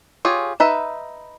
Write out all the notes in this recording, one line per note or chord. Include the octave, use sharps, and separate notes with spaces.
F4 G4 G#4 C#5
D#4 B4 E5